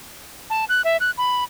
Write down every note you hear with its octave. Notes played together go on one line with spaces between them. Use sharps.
A5
F#6
E5
F#6
B5